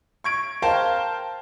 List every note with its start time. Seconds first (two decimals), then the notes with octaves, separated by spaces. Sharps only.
0.24 C#6 G#6 D7
0.62 A#4 C5 F5 G5 A5